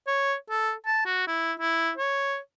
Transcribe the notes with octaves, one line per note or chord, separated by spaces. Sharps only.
C#5
A4
A5
F#4
E4
E4
C#5